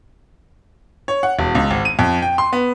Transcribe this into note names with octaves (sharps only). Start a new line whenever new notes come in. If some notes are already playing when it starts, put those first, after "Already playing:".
C#5
F#5
E1
C#2
G#1
D#7
F2
G5
C6
B3